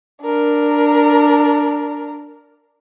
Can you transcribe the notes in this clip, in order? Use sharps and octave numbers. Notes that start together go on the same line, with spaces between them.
D4 A#4